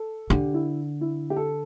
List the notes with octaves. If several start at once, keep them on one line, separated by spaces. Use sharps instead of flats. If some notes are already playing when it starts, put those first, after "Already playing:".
Already playing: A4
D3 G4
E4
E4
G4
A4